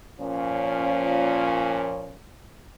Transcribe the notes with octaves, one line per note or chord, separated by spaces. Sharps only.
A#2 F3 C#4